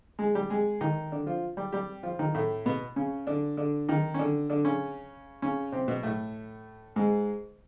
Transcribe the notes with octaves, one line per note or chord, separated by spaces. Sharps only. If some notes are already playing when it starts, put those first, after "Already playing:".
G#3 G#4
G3 G4
G#3 G#4
D#3 D#4
D3 D4
F3 F4
G3 G4
G3 G4
F3 F4
D#3 D#4
A2 A3
B2 B3
C#3 C#4
D3 D4
D3 D4
D#3 D#4
C#4
D3 D4
D3 D4
C#3 C#4
C#3 C#4
C3 C4
B2 B3
A2 A3
G#2 G#3